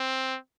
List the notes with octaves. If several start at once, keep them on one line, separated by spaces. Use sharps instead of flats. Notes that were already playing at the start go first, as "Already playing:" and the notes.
Already playing: C4